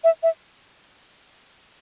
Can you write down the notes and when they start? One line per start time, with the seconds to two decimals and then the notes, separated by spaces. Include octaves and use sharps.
0.04 E5
0.23 E5